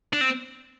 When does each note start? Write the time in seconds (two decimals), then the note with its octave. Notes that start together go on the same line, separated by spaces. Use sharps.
0.13 D4
0.21 C4